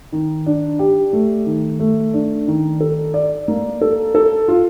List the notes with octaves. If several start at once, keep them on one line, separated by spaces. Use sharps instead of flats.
D#3
D4
G4
A3
D#3
A3
D4
D#3
A4
D5
A#3
A4
A4
F4